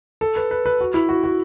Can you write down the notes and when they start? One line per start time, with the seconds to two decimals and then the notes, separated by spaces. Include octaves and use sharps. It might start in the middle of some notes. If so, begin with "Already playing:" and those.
0.21 A4
0.36 B4
0.51 B4
0.66 B4
0.81 F#4
0.94 E4
1.09 F#4
1.24 F#4